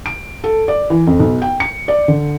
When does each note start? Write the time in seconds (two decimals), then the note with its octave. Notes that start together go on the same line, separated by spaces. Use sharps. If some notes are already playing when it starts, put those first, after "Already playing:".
0.06 D7
0.44 A4
0.68 D5
0.90 E3
1.07 F2
1.20 B1
1.42 G5
1.60 C#7
1.88 D5
2.08 D3